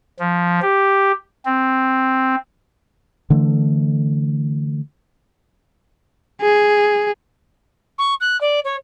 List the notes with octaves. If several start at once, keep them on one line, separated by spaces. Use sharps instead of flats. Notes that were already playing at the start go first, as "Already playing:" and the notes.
F3
G4
C4
D3 E3 A3
G#4
C#6
F#6
D5
C#5